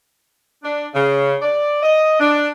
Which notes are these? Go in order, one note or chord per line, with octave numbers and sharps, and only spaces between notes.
D4
C#3
D5
D#5
D4